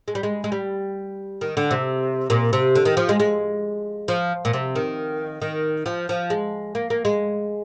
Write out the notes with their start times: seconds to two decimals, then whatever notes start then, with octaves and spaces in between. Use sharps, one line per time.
0.08 G#3
0.15 G3
0.23 G#3
0.44 G#3
0.52 G3
1.41 D#3
1.57 D3
1.71 C3
2.30 A#2
2.53 C3
2.75 D3
2.85 D#3
2.97 F3
3.09 G#3
3.20 G#3
4.08 F3
4.45 A#2
4.53 C3
4.75 D#3
5.42 D#3
5.86 F3
6.09 F3
6.30 G#3
6.75 A#3
6.90 A#3
7.05 G#3